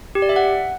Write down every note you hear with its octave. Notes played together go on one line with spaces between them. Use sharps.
G4
D5
E5
F#5